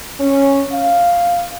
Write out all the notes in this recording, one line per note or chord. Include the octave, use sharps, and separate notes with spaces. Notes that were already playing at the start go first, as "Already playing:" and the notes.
C#4
F5